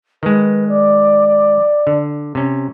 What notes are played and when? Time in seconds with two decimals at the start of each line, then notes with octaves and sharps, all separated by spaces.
0.23 D#3 G#3 B4
0.69 D5
1.87 D3
2.35 C3 C#4